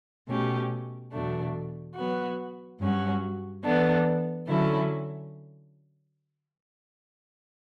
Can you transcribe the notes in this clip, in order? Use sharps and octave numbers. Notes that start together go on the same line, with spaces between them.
B2 A3 C#4 G4
E2 B2 F#3 A3 D4
F#3 B3 F#4
G2 F#3 C#4 F#4
E3 B3 D4 A4
D3 F#3 C#4 E4 A4